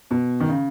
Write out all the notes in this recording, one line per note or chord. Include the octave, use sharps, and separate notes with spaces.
B2
D#3
C#3